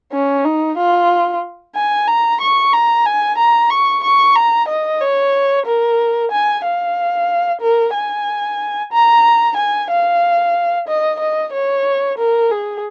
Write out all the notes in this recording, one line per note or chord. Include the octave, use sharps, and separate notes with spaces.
C#4
D#4
F4
G#5
A#5
C#6
A#5
G#5
A#5
C#6
C#6
A#5
D#5
C#5
A#4
G#5
F5
A#4
G#5
A#5
G#5
F5
D#5
D#5
C#5
A#4
G#4